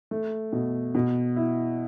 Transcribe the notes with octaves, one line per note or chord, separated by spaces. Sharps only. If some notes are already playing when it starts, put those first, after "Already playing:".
A3
B2
B2
E4